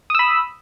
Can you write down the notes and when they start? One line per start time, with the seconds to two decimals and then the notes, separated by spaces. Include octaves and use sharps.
0.10 D#6
0.15 E6
0.19 B5